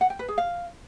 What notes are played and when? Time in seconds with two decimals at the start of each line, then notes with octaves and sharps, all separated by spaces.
0.01 F#5
0.10 G5
0.19 B4
0.28 G#4
0.38 F5